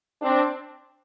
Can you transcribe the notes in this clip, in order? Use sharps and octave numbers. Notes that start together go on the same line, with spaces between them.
C4 D4